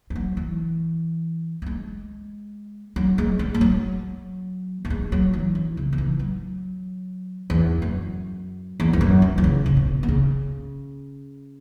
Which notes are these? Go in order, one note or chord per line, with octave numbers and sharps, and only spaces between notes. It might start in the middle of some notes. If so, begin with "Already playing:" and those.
G#3
F#3
E3
F#3
G#3
F#3
G#3
G#3
G#3
F#3
F#3
G#3
F#3
E3
E3
C#3
F#3
E3
F#3
E2
F#2
E2
E2
F#2
E3
E3
C#3
C#3
B2
B2
C#3